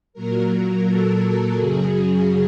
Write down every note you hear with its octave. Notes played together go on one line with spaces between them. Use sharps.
A#2 F#3 A#4
A#4
A4
F#2 C#3 F#3 G#4